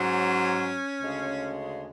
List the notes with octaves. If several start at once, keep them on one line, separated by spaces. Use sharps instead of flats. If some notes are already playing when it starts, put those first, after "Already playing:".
Already playing: G#2 F#3 C#4
D2 C#3 G#3